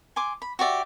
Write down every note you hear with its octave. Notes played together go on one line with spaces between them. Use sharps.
G#5 C6 D6
B5
F#4 G4 D5 E5